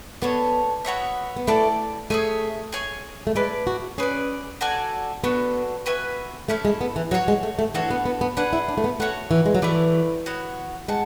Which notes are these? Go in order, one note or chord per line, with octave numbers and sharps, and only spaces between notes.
B3 D4 A4 C#5
B3 F#4 C#5 E5
B3
A3 E4 A4 D5 A5
A3 G#4 C#5 E5 G#5
G#4 C#5 G#5
A3
G#3 E4 B4 D5 A5
F#4
C#4 G#4 B4 D5
F#4 A4 D5 G#5
B3 D4 F#4 A4
F#4 B4 E5 G#5
A3 C#4 E4 A4
G#3
B3
E3
F#3 F#4 A4 C#5
G#3
A3
A3
E3 D4 F#4 A4 C#5
B3
B3
B3
D4 G#4 B4 F#5
E4
D4
A3
B3
A3 F#4 C#5 F#5
E3
G#3
F#3
E3 A3 E4 B4 D5
B3 F#4 C#5
G#3 F#5 A5